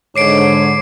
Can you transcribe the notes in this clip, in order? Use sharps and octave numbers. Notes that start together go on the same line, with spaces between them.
G#2 D3 C#5 D6 C7 D7